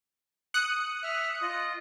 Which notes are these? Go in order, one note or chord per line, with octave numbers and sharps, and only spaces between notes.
D#6 F#6 C#7
E5 F6
F4 D#5